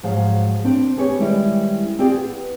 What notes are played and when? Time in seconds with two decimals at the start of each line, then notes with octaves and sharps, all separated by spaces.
0.03 G#2 F3 F#3 G#4 F5
0.64 C4 D4 C5
0.96 C4 G4 G#4 B4 C#5
1.19 D#3 G3 G#3 C#4 E4 D5
1.99 C4 F4 G4 G#4 D5
2.15 B3